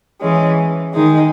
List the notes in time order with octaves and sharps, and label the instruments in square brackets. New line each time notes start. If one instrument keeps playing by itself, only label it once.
[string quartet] E3 G#3 C#4
D#3 G#3 D#4